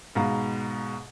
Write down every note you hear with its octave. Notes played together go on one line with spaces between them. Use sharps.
G#2 B2 F5 A#5